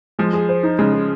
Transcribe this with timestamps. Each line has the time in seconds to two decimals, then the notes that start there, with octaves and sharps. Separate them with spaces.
0.19 F3 G#3
0.33 G#4
0.49 C5
0.63 D#4
0.79 C#3 G#3
0.94 G#4